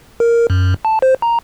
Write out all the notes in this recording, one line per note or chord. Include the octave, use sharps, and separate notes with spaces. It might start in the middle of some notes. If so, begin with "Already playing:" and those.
A#4
F#2
A5
C5
A#5